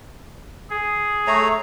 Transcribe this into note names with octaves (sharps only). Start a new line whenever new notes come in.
G#4
A3 C#5 A#5